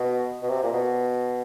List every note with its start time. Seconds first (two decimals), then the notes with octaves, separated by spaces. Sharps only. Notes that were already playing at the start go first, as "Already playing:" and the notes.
Already playing: B2
0.42 B2
0.49 C3
0.63 A#2
0.73 B2